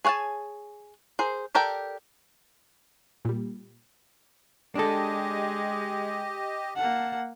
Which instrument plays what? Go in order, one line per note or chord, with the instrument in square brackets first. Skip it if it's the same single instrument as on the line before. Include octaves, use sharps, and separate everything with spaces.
[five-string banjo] G#4 C#5 F#5 G#5 A5
G#4 A#4 C5
G4 A4 A#4 D5 G5
[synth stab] A#2 G3
[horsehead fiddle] G#3 [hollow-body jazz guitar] D4 A4 [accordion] G4 D#5
[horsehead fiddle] A#3 F#5 [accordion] A5